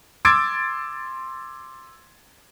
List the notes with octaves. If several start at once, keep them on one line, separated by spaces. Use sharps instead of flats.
C6 D6 E6 G#6 A6 D7